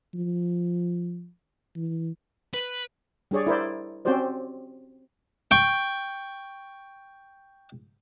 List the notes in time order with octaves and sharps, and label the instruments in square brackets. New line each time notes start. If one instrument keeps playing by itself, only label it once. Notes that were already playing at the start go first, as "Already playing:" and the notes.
[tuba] F3
E3
[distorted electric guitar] B4
[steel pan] G3 D4 G#4 C#5 D5
E4 A#4 C5 D5
C4 C#4 F#4 G4 C5 D5
[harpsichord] G5 C#6